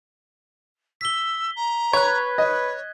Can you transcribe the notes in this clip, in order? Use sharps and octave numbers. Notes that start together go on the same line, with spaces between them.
E6 B6 G7
A#5
B4 C#5 F#6 G#6
C#5 D#5